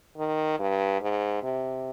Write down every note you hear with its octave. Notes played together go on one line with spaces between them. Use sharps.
D#3
G2
G#2
C3